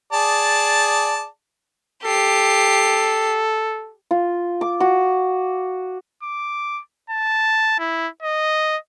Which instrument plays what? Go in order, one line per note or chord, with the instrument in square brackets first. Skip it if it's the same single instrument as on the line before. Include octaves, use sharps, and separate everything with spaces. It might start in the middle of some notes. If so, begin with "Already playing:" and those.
[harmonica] G#4 D5 A5
[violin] G4 C7 [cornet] A4
[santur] F4
D6
F#4
[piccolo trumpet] D6
A5
E4
D#5